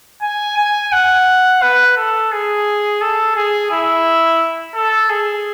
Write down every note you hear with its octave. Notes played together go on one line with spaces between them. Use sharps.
G#5
G#5
F#5
B4
A4
G#4
A4
G#4
E4
A4
G#4